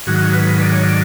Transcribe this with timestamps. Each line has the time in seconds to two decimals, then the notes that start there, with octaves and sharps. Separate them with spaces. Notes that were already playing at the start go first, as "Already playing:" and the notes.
0.06 G#2 D#3 F#3 F#4
0.33 B4
0.61 D5
0.72 C#5
0.83 D5